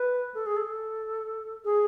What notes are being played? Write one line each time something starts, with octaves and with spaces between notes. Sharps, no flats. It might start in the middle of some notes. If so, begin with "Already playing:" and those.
Already playing: B4
A4
G#4
A4
G#4